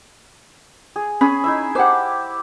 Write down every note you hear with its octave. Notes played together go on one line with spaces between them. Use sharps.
G#4
C#4 G#4 B5
D#4 E4 E5
G4 C5 F#5 D6